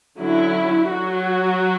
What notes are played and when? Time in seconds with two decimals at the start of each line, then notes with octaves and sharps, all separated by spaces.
0.20 D3 F#3 C#4 E4
0.90 F#3 F#4